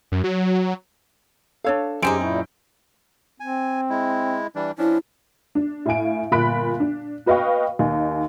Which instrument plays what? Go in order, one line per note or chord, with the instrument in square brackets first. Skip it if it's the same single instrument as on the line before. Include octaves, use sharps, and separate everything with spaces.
[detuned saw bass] F#2
F#3
[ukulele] D4 C#5 F5 [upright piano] A4 E6
[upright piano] F#2 G6 D7 [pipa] G#3 C4 D#4 [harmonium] G4 G#4
[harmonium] A#2 E4 [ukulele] C#4
[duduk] C4 [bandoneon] G#5
[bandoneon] G#3 E4
E3 G3 D4
[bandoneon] F3 C#4 D4 [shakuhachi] E4
[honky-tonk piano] D4
A2 F5 G#5 D7
G1 A#2 B5 F#6 B6 D7
D4
F#4 B4 D#5 F5 G5 C#6
D#2 D#4 G#5